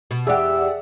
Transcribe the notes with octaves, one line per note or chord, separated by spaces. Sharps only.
B2
E2 G4 G#4 D5 E5 F#5